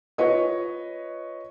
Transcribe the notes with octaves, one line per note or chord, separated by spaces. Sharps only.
F4 B4 C#5 D#5